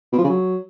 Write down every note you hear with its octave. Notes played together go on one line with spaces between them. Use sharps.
B2
F3
C#3
F#3